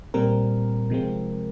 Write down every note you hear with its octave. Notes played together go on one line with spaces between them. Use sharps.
A#2 G3 C4 A#4
C3 F3 G#3 C4